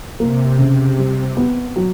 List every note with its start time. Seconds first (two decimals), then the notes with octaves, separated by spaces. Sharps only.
0.20 C3 A#3
0.59 C#3
0.98 G3
1.37 B3
1.76 F#3